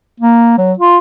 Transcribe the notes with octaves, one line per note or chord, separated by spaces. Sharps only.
A#3
F#3
F4